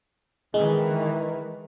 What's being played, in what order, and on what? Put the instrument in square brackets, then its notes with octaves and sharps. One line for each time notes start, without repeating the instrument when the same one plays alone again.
[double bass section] D#3 E3 [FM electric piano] G#3